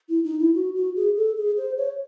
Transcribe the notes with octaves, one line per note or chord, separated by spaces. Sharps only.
E4
D#4
E4
F#4
F#4
G#4
A4
G#4
C5
C#5